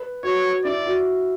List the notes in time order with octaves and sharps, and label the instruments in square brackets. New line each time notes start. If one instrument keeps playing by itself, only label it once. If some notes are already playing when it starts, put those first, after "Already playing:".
Already playing: [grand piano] B4
[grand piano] F#4 [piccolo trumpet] C#5
[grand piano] E4 [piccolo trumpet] D5
[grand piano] F#4